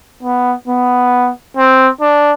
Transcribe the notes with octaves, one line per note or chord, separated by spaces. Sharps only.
B3
B3
C4
D4